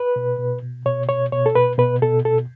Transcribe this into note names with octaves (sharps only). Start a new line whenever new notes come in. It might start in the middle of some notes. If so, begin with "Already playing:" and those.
Already playing: B4
B2
B2
B2
B2 C#5
B2 C#5
B2 C#5
A4
B2 B4
B2 B4
B2 A4
B2 A4